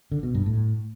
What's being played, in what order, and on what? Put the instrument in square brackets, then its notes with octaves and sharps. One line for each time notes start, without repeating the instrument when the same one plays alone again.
[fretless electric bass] D3
B2
G2
A2